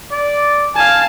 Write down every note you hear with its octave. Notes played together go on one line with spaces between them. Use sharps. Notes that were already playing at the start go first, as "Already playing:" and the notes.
D5
F5 G#5 A5